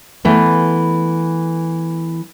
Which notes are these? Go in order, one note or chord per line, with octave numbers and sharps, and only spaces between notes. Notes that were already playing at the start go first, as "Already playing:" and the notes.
E3 A3 B3